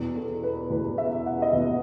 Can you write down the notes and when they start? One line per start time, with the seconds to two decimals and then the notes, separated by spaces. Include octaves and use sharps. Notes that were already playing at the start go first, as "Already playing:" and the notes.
Already playing: E2 B2
0.15 A4
0.43 B4
0.70 E2 B2 B4
0.98 E5
1.26 F#5
1.42 D#5
1.53 E2 B2 E5